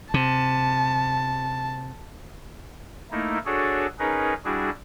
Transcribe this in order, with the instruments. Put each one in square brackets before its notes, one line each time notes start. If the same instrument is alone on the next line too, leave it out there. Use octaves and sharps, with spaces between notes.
[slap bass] C3 [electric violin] A5
[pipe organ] A3 A#3 D#4 E4
D4 F#4 G#4 A4 C#5
C#4 D#4 G#4 A#4 B4
G3 D4 E4 F#4 G#4